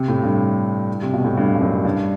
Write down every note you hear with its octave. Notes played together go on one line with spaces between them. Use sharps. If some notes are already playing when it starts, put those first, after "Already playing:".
Already playing: C3
A2
G2
C3
B2
A2
G2
G2
F#2
G2